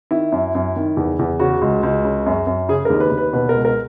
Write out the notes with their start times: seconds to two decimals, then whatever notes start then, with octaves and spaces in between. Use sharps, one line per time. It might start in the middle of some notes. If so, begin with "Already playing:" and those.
0.11 D#3 E4
0.32 F#2
0.55 F#2
0.76 D#3
0.97 E2
1.19 E2
1.39 C#3 F#4
1.61 C#2
1.83 C#2
2.05 C#3
2.26 F#2
2.47 F#2
2.69 C#3 G#4
2.85 D#2 A#4
3.00 B4
3.11 D#2
3.17 B4
3.33 B2 B4
3.49 C#2 A#4
3.65 A#4